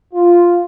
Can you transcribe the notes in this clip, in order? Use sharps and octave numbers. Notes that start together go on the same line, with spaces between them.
F4